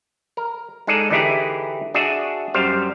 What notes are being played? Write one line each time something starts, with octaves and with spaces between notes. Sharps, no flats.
A#4
G#3 D#4 G#4 A4 D5
D3 E3 D#4 E4 G4 G#4
D4 F#4 G#4 E5
F#2 G3 C5 F5